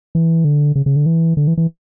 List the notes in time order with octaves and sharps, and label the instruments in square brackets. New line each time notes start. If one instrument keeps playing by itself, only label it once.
[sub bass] E3
D3
C#3
C#3
D3
E3
D3
E3
E3